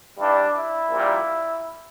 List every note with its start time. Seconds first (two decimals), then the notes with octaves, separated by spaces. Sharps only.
0.18 G2 E3 G3 D4
0.54 E4
0.91 A#1 A#2 G3